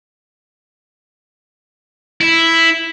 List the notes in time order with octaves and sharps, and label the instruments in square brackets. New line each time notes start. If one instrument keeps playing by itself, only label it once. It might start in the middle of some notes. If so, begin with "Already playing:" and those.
[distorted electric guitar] E4